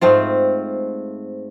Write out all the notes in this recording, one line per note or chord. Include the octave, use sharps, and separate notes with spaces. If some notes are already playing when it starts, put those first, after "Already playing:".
G#2 A3 C4 F4